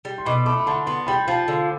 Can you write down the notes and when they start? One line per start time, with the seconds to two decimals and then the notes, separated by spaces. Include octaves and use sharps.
0.05 G3
0.18 C6
0.25 B2 B5 D6
0.46 A3 B5 D6
0.60 B5
0.66 D3 A5 C6
0.86 B3 A5 C6
1.07 G3 G5 B5
1.27 F3 F5 A5
1.48 D3